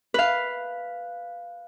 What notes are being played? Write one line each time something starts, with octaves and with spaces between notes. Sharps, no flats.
B4 F5